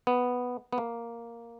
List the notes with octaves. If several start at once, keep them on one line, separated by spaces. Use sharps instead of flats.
B3
B3
A#3